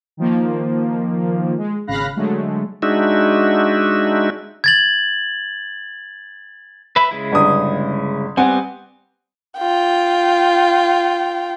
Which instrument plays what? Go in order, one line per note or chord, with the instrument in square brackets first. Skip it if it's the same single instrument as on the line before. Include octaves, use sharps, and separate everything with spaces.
[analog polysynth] D#3 F3 A#3
G#3
G#1 C#3 F5 B5 F#6 A#6
D3 F#3 G#3 A3
[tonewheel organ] G#3 D4 D#4 F#4 E5
[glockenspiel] G#6 A6 F#7
[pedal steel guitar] B4 E5 B5
C#3 G#3 E4
[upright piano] G1 D#6
[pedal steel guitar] G3 B3 [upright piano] C4 F#5 G#5
[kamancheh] F4 G5